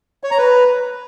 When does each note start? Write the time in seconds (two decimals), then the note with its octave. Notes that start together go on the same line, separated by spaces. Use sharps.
0.24 C#5
0.31 A#5
0.38 B4